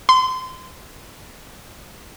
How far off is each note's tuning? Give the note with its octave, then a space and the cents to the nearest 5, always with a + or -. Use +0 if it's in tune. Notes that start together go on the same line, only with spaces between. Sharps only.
C6 -30